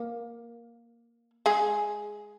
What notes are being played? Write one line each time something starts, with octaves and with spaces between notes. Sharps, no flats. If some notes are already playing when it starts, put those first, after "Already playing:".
Already playing: A#3
G#3 G#4